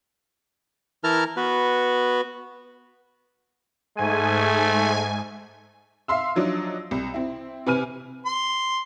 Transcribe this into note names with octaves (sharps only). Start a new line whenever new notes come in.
E3 E4 A#4 A5 A#5 F6
B3 F#4 B4
G#2 A3 G#5
E5 F5 C6 E6
F3 F#3 D4 D#4
C2
C4 E4
C3 B4 G#5 F6 D#7
C6